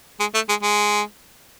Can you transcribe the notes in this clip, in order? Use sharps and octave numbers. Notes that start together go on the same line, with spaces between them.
G#3
A3
G#3
G#3